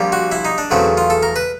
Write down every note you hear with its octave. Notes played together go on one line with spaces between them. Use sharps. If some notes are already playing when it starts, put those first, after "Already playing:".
Already playing: A#1 A#2 G3
F#4
E4
D#4
D4
E2 C#3 F#3 A3 C4
F4
A4
A#4
B4